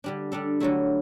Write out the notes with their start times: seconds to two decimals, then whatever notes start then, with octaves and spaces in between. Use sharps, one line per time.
0.04 D3 G3 D4
0.32 G3 D4 A4
0.60 D3 F#3 A3 E4